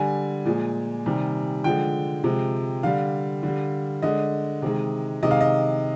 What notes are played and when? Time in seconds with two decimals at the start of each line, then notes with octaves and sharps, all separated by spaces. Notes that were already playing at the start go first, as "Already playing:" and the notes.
Already playing: D3 G3 G#5
0.45 A#2 F3 G#3
1.06 C3 D#3 G3
1.64 D3 F3 G#3 G5
2.24 C3 F3 G#3
2.83 D3 G3 F5
3.43 D3 G3
4.02 D3 G#3 D#5
4.62 C3 D#3 G#3
5.23 C3 D#3 G#3 D#5
5.31 F5
5.41 D#5